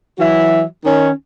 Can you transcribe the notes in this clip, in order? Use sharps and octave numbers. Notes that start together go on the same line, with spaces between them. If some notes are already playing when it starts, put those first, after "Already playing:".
E3 F#3 F#4 E5
D#3 C#4